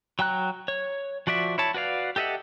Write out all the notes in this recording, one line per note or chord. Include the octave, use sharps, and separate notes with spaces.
F#3 G5 A#5 F#6
C#5
F3 F#4 D5 E5
E4 C#5 A5
F#4 B4 D5 F5
G4 A4 D#5 E5 F#5